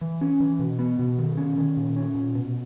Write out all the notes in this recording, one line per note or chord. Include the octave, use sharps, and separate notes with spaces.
E3
C#4
E3
B2
B3
B2
D#3
C#4
D#3
A#2
C#4
A#2
B2